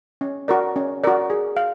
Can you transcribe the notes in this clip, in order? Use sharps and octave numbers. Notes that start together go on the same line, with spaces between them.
C#4
F#4 A#4 D5
C#4
F#4 A#4 D5
G#4
F5